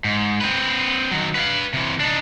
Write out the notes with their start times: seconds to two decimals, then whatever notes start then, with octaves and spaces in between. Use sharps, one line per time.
0.04 G#2
0.41 C4 B4
1.11 D#3 F#3
1.35 B4 F5
1.74 C3 E3
2.00 D4 D#4